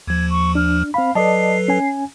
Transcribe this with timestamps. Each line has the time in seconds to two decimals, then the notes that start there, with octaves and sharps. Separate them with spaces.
0.07 D#2 F3 G#6
0.30 C#6
0.55 D4 F6
0.94 C4 F5 B5
1.15 F#3 A4 B4 D5 D#5 A5 C7
1.68 C#4 G#5